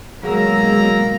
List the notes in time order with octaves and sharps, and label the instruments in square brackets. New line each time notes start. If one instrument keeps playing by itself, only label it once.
[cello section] B2 D#3 G#3 [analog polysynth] F#3 E6 [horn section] A#3 A#5 [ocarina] G#4